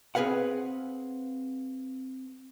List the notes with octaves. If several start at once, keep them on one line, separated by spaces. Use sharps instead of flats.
C4 G#4 B4 F5 F#5